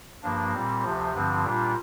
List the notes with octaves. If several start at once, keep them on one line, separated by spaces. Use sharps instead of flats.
G2 F3 A#3 D4
A#2 G3 C4
D2 C3 F3
G2 D3 F3 C4
A#2 G3 D4 F4